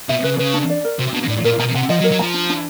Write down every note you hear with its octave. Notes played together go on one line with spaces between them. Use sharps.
B2 E5
C#3 B4
C#3 B4
D4
D5
A#4
C3 F#4
B2 D4
A2 D5
A#2 A#4
B2 A#5
C3 F#5
F3 D#5
F#3
A#4
F#3
F3 A#5
D4
D4